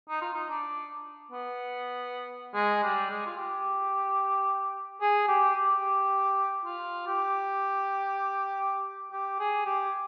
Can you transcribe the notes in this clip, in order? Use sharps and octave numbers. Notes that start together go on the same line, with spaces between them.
D#4
F4
D#4
D4
B3
G#3
G3
G#3
F4
G4
G#4
G4
G4
F4
G4
G4
G#4
G4